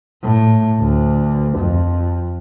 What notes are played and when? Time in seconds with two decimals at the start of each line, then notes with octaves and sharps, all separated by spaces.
0.23 A2
0.80 D2
1.58 F2